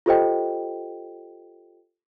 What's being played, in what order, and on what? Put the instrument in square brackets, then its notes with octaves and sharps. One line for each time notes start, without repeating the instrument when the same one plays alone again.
[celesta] F4 G4 A4 C5 D#5 G5